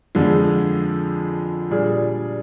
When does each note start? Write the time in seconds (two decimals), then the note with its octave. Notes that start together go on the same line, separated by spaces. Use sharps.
0.15 F2 D3 F3 G#3
1.70 A#2 G3 D4 G#4